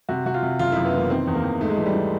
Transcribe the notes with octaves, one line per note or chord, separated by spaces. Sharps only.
C3 F#4
C3 F#4
F4
C3
F#1 F4
F#2 E4
B3
E3 A#3
D#3 C4
E2
A#3
E2
G#2 A3
G#3
E3 A3
G3
E3